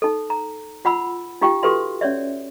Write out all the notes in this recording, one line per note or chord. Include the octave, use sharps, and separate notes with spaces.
D#4 A4
A#5
F4 F#5 B5 E6
D#4 F4 G4 F5 G5
F#4 G4 A4 B4 F5 C6
C#4 C#5 D5 E5